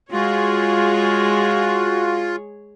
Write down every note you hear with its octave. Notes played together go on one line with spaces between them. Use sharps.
G#3 F4 F#4 G#4 C#5